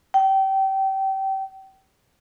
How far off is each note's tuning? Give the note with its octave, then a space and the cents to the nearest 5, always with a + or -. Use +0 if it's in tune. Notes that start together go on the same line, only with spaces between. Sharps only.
G5 -25